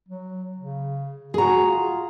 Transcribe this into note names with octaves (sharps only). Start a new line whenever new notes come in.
F#3
C#3
F#4 G#4 A#5
F4